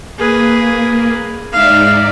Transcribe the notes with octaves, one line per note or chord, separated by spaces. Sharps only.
A#3 G#4 B4
G#2 D#4 D5 E5 F5